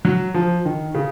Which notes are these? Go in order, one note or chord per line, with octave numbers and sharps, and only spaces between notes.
F#3
F3
D#3
C#3